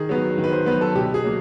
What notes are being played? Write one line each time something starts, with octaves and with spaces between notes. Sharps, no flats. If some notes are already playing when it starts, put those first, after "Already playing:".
Already playing: D#3 G#4
F#3 B3
D#3
B4
C5
F#3 B3 B4
A4
B2 G4
G#4
F#3 A#3